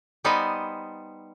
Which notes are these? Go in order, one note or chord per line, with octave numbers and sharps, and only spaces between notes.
G3 B3 D#4 B4 C5 G#5